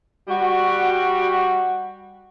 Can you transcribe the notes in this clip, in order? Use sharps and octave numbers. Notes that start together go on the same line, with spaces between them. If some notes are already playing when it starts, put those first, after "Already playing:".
G3 F#4